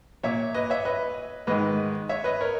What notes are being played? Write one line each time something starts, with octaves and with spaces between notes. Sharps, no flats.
A#2 C#5 E5
B4 D#5
C#5 E5
B4 D#5
G#2 D#3 B4 D#5
C#5 E5
B4 D#5
A#4 C#5